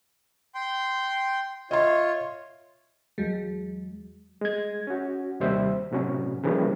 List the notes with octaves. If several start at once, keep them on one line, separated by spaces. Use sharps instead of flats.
G5 C6
F4 C#5 D#5 E5 C6
E2 F#3 G#3
G#3 G#6
C#4 F#4
D#2 C3 G3 C5 E5
A2 C3 F#3 C#4
C#3 E3 F3 G3 A#3